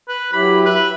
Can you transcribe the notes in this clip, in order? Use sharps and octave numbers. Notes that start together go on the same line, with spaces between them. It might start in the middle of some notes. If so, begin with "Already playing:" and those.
B4
F#3 E4 G4 B5
B4 E5